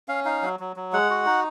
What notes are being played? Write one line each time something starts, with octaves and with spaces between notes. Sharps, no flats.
C#4 F5
D#4 F5
F#3
F#3
F#3
G#3 F#5
F#4
D#4